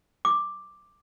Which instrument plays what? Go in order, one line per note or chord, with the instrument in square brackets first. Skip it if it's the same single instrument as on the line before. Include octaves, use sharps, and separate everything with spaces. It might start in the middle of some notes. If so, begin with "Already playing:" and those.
[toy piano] D6